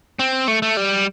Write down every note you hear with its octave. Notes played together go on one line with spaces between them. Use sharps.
C4
A3
A3
G3